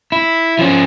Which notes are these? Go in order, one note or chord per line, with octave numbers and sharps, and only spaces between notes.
E4
F3 C#4